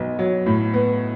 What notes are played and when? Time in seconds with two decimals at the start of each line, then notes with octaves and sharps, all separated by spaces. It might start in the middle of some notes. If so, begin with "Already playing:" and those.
Already playing: B1 B3
0.19 F#3
0.46 A2
0.74 B3